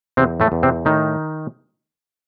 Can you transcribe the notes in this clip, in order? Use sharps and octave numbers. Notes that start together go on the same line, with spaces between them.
E2 C3 C4
A2 A3
E2
C3 C4
A2 D#3 D#4